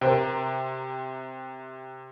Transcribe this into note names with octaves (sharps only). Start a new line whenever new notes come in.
C3 A#4 C5 G5